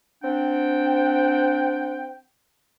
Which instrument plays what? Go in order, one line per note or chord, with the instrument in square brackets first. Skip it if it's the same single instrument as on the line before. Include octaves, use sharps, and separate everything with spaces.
[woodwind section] C4 D4 F#5 G5